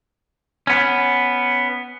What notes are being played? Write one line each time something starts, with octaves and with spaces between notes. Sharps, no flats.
B3 C#4